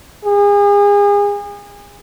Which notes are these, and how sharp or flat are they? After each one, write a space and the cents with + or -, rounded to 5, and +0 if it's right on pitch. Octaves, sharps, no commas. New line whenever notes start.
G#4 -35